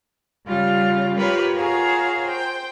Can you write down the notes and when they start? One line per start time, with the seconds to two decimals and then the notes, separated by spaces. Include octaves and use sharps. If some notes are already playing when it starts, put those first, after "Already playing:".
0.47 C#3 G3 F4
1.17 F4 G4 A#4 B4 C#5
1.54 F4 F#4 G#4 A#4 C#5 F5
2.24 C5 G5